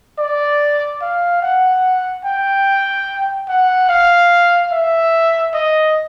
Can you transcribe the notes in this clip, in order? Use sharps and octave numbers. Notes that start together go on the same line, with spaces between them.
D5
F5
F#5
G5
F#5
F5
E5
D#5